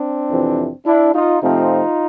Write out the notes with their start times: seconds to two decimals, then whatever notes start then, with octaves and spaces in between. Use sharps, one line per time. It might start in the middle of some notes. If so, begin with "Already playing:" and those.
Already playing: C4 D4
0.30 F2 C3 E3
0.86 D4 E4
1.13 D#4 F4
1.42 C3 F3 A3 C4 D#4 F4